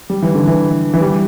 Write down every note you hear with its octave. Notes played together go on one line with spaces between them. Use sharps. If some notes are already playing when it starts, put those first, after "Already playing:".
G3
E3
D3
E3
E3
G3